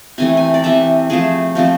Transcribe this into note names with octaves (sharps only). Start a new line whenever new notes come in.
C3 E3 A3 G#5
G#5
D5
C3 E3 A3 E5
C3 F3 A3 G#4
C3 F3 A3